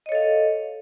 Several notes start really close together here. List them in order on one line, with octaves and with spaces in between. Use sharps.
D#5 C#5 A4 F5